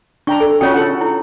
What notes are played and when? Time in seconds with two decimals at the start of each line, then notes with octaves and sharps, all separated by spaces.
0.27 D4 G5 A#5 C#6
0.40 A4
0.61 C#4 F4 F#4 C#5 G5 D#6
0.74 A4 F#5
1.01 E4